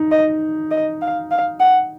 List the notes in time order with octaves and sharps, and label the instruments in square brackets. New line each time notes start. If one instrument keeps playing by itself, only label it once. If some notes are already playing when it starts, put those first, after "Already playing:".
Already playing: [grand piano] D#4
[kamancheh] D#5
D#5
F5
F5
F#5